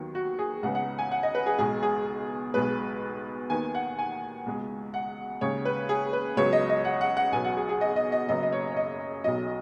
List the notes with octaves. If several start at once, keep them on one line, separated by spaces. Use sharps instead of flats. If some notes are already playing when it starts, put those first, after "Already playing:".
Already playing: D#2 D#3 F#3 B3
F#4
G#4
C#2 C#3 G#3 B3 F#5
F#5
G#5
F#5
D#5
B4
G#4
B1 B2 G#3 G#4
G#4
B1 B2 G#3 B4
D#2 D#3 B3 G#5
F#5
G#5
C#2 B2 G#3
F#5
D#2 C#3 G#3 C#5
B4
G#4
B4
C#2 C#3 F#3 B3 C#5
D#5
D#5
F#5
F#5
F#5
B1 B2 F#3 B3 G#5
F#5
G#4
G#4
D#5
D#5
D#5
F#1 F#2 C#3 F#3 B3 D#5
D#5
C#5
C#5
D#5
B1 B2 F#3 D#5